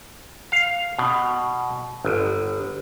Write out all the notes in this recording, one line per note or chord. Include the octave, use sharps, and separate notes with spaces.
F5
B2
G1